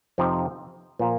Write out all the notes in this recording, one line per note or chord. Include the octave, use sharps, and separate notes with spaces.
F2 C3 F3 C4 D#4
A#2 F3 A#3